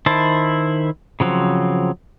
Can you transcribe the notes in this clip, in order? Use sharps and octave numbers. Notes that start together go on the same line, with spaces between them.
D#3 E4 C5 A5
C#3 F3 F#3 C4